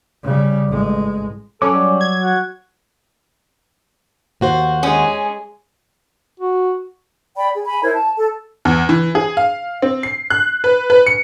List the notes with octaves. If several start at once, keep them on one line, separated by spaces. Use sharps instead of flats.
C#3 G3
A1 G#3
F#3 C#4 A4 D6
G3
G#6
F#4
D#2 F#4 C5
G#3 C#4
F#4
D5 G5 B5
G#4
G#5 B5
E4 A#4 C5 C#5
A5
A4
E2
E3
G#4
F5
C4
C7
F#6
B4
B4
C#7